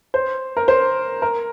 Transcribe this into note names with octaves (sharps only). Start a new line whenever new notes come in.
C5
A#4
C5
A#4